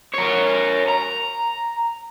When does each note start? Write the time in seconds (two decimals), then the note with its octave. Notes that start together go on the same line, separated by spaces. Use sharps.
0.14 A#4 C#5
0.88 A#5